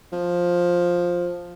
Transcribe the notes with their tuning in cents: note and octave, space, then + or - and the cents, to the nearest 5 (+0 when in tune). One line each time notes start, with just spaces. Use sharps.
F3 +10